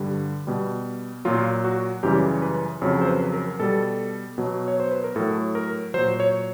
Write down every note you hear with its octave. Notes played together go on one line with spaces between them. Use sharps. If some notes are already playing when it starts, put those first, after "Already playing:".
Already playing: G2 D3 G3
B2 G3
A#2 F#3 F4
F#4
F#2 C#3 E3 G3 G4
B4
F2 C#3 F#3 C#5
C5
B4
A#4
B2 G3 A4
B2 F#3
C#5
C5
B4
A#4
A2 F#3 A4
A#4
A#2 F#3 C5
C#5